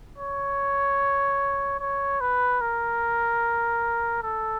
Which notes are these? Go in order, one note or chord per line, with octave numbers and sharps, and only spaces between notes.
C#5
C#5
B4
A#4
A4